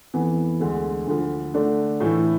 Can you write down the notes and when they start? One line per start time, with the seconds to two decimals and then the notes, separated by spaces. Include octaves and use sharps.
0.14 F2 E3 B3
0.60 D2 D3 G#3
1.07 D2 D3 F3
1.54 D3 A3 D4
2.00 A2 E3 A3 E4